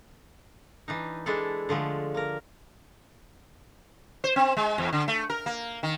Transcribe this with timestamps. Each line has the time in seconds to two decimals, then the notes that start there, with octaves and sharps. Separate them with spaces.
0.88 E3 D4 D#4
1.26 E3 G#3 D4 E4 A4
1.69 D3 F3 G#3 A3
2.14 A#3 A#4
4.24 C5
4.36 C4
4.57 G#3
4.78 E2
4.93 D3
5.08 A3
5.30 A#4
5.46 A#3
5.83 D#3